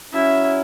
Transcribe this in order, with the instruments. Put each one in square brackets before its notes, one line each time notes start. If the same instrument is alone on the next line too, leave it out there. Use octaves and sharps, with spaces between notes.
[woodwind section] F#3 C#4 E4 [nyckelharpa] E5